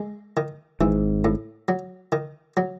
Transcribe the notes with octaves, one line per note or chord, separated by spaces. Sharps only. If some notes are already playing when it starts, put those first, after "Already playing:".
Already playing: G#3
D#3
G#1 G#2 E3
A2
F#3
D#3
F#3